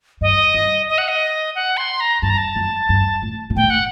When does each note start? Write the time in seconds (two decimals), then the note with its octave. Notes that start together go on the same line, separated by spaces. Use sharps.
0.21 G2 D#5
0.54 G2
0.88 D#5
0.98 F#5
1.08 D#5
1.55 F#5
1.77 C6
2.00 A#5
2.22 G2 A5
2.30 A#5
2.38 A5
2.56 F#2
2.89 G2
3.22 A2
3.50 A#2
3.56 A2 G5
3.70 F#5